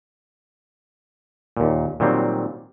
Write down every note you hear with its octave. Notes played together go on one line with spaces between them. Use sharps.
D#2 A#2
A#2 D#3 F#3 G3 C4